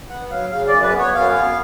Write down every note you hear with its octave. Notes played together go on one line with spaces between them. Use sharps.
B3 F#5
F#3 F5
C#3 F5
F#2 D5
B4
B3
C#5
F#2 F5
B3